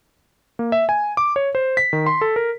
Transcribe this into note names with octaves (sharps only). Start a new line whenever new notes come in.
A#3
E5
G#5
D6
C#5
C5
B6
D#3
C6
A4
A#4